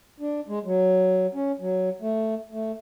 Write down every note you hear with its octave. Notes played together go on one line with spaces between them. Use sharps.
D4
G#3
F#3
C#4
F#3
A3
A3